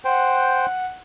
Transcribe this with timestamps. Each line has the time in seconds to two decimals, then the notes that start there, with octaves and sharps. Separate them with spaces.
0.05 C5 F#5 G5